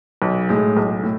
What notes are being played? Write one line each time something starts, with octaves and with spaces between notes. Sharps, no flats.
B1
A2 G#3
B1
A2